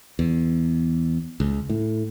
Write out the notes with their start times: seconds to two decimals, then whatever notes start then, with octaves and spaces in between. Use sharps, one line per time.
0.19 E2
1.40 C#2
1.70 A2